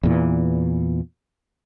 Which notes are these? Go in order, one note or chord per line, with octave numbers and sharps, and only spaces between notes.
E2 A#2 E3